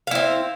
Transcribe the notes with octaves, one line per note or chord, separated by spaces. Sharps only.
C4 E4 F5